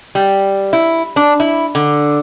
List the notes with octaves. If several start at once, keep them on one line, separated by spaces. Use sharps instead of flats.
G3
E4
D4
E4
D3